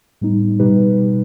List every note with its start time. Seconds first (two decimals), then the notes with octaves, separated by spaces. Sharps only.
0.21 A2 G3 B3 D#4
0.59 B2 G3 D#4 G4 B4